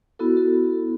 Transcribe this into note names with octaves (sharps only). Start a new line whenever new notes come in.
B3 E4 F#4 A4
F#4 A4